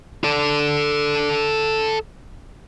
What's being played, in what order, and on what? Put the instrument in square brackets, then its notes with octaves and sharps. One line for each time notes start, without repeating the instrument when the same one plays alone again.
[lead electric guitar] A4 D5